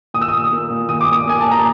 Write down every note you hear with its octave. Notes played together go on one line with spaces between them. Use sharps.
A#2 D#6
E6
A#2 D#6
A#3
A#2
A#2 D#6
D6
A#2 D#6
A#3 G#5
A#2 A5
A#5